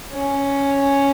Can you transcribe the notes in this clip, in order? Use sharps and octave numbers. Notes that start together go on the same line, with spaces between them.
C#4